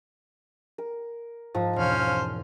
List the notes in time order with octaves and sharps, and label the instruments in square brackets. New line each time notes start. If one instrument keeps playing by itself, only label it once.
[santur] A#4
[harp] G#2 [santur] F3 A#5 E6
[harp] E1 [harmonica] C#4 C5 F5